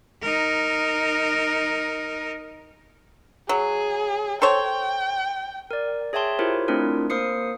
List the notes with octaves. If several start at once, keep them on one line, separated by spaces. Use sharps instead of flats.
D#4 A#4
F#3 G#4
A4 C5 C#5 G5
A#4 D5
G#4 C#5 E5 G5 A5 C6
E4 F4 G4 A#4 C5 C#5
A3 C4 D4 E4 F4 A#4
A#3 A#4 C5 D#6 C7 C#7